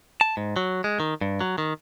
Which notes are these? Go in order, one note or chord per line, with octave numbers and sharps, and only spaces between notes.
A5
G#2
F#3
G#3
D#3
G2
F#3
D#3